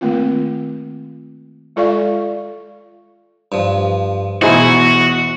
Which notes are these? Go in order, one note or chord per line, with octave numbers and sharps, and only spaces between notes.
D#3 A3 A#3 C4 F4
G#3 F4 A4 D5 F5 C#6
G2 F3
E2 B2 D#4 E4 F#4 G#4 C5